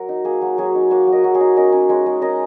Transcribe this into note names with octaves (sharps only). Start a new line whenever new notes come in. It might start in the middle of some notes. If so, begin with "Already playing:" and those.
Already playing: F#3 F#4 A#4
D#4
A#3 G#4
F#3
F#3 G#4 C#5
D#4
A#3 C#5 F#5
F#3
A#4 D#5
F#3
G#4 C#5
D#4
C#4 A#4 D#5
C#4
G#3 C#5 F#5
G#3
C#4 A#4 D#5